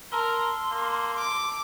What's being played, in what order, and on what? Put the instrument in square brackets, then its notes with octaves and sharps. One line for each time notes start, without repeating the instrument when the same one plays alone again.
[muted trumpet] A#4 [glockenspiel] A5 E6 G7 [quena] C6
[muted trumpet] A#3
[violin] D6